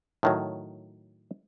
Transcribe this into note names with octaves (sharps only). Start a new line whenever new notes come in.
A2 D#3 F#3